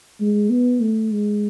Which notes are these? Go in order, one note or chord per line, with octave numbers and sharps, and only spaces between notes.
G#3
B3
A3
G#3